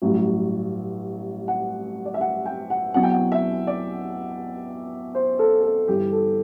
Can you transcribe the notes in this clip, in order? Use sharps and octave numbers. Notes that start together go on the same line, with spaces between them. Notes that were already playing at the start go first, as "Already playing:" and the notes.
A1 G2 F#3
F#5
D5
E5
F#5
G5
F#5
E2 B2 F#3 F#5
G5
F#5
E5
D5
C5
A4
A4
G1 G2 E3 G3 G4
A4